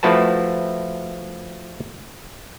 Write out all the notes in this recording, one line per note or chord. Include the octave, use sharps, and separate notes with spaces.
F3 A3 E4 F#4 B4 A5